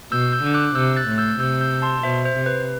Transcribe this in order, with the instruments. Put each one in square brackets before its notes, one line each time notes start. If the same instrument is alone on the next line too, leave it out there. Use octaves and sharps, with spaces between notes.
[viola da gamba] B2 [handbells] E6 G6
[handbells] E6 G6
[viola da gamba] D3
[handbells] D6 F#6
[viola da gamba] C3 [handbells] E6 G6
[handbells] F#6 A6
[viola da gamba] A2
[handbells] E6 G6
[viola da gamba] C3 [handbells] E6 G6
[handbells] E6 G6
A5 C6
[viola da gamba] B2 [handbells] C5 E5
[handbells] C5
[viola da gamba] C3
[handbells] B4